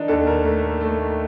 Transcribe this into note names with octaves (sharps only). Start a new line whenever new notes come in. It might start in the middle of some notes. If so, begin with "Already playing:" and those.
Already playing: D#3 D4 D#4
D#2 A4
A#4
A3
A3